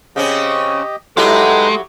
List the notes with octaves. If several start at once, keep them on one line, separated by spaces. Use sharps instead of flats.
C#3 C4 C#4 G4 D#5
F#3 G#3 D#4 E4 G4 A4 B4